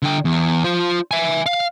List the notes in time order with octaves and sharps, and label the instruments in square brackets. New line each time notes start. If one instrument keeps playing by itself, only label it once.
[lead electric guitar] D3 G5
E2
F4 C5
E5 G#5
F5